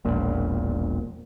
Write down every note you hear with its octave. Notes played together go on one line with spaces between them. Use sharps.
E1 A#1 A#2